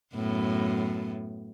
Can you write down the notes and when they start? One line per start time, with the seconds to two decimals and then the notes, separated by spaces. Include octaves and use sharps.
0.15 F#2 A2 B3